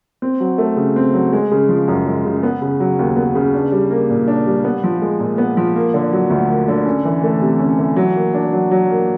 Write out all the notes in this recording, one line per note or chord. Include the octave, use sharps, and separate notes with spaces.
C4
F#3
A3
C#3
C4
F#3
G#3
C#3
F3
F#2
G#3
C#3
B3
C#3
F#3
D#2
B3
C#3
D4
G3
A#3
A#2
D4
G3
B3
F3
G#3
A#2
B3
F3
A#3
D3
F#3
D2
A#3
D3
C#4
E3
A3
C3
C#4
E3
F#3
A#3
D4
F#3
F#3
A#3